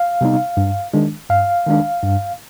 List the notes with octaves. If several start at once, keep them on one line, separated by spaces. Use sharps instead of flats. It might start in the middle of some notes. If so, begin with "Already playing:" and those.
Already playing: F5
C3 G3 B3 D#4
G2
D#3 G#3 D4
G2 F5
D#3 G#3 D4
G2